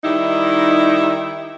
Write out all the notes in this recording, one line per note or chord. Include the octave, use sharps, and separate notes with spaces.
D#3 G3 D#4 E4